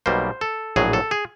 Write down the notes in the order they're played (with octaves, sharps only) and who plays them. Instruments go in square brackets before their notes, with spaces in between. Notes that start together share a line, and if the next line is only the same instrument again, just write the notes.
[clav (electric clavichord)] B1 B2 G3 A#3 C5
A4
A#1 A2 F#3 G#4
A4
G#4